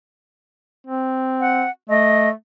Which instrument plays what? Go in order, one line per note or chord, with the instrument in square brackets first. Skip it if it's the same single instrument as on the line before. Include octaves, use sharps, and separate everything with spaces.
[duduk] C4
[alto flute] F#5
[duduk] A3 [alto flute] D#5